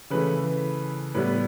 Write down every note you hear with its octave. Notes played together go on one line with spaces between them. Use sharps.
C#3 E3 A3 B4
A2 G3 B3 B4